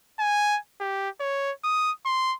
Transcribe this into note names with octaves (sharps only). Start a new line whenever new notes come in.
G#5
G4
C#5
D#6
C6